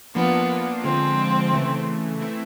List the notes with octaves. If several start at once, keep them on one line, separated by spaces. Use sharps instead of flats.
F3 A#3 B3 D4 F4
D3 F3 G#3 C4
C#3 E3 A3
E3 A3 C4 E4